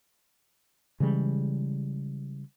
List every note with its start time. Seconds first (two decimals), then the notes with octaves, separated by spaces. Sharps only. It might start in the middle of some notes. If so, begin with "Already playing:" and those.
1.00 C#3 E3 G3 G#3